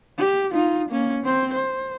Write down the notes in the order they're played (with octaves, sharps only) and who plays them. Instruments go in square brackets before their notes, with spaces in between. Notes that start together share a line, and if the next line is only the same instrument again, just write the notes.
[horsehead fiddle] G4
D#4 F4
A#3 C#4
C4 C5
C5